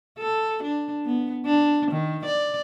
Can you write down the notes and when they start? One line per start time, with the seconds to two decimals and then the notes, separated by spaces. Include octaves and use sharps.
0.19 A4
0.63 D4
1.05 B3
1.46 D4
1.92 D#3
2.25 D5